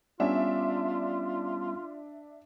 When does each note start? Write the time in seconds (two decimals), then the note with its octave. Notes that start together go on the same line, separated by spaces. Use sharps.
0.20 G3 B3 C#4 D4 F4 E5